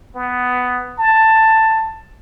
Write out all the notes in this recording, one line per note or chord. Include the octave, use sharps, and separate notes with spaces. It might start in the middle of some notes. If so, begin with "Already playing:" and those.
B3
A5